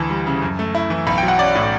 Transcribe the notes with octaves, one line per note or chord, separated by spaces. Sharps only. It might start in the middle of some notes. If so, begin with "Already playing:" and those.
Already playing: D2 E3 A5
G3
C#3
F#2
A3
E4
E3
B1 B5
F#3 G5
F#5
C#4 D5
A2